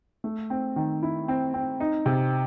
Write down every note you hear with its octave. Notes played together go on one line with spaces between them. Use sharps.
A3
C4
D#3
E4
C4
C4
D#4
C3